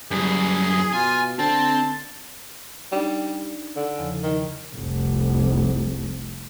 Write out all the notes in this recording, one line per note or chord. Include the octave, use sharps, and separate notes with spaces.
F#2 G3 E4 G#4
B2 F4 G#5
D3 C4 A5
G3 D4 D#4
D3
E2 C#3 F3
D#3
F1 C2